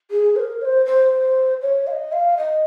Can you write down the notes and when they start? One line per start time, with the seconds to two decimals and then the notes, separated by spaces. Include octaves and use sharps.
0.11 G#4
0.36 C5
0.40 A#4
0.62 C#5
0.65 C5
0.86 C5
1.62 C#5
1.87 F5
1.91 D#5
2.12 F5
2.38 D#5